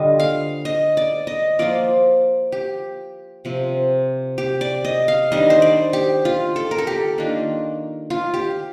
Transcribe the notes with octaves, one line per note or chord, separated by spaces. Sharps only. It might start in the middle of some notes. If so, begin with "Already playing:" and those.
Already playing: D3 G3 D4 F4 D#5
F5
D#5
D5
D#5
F3 A#3 F4 D5
G4
C3 F3 C4
G4
D5
D#5
F5
D#3 G3 D4 D#5
C5
D5
G4
F4
A4
A#4
A4
G4
D#3 A#3 D4 F4
F4
G4